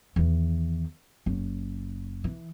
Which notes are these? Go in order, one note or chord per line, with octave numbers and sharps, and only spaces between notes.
E2 D#3
F#1
E3